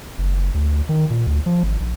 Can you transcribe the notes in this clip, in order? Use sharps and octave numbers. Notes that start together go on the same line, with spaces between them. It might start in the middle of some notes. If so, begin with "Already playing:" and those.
F#1
D2
D#3
A#2
D2
F3
G#1
A#1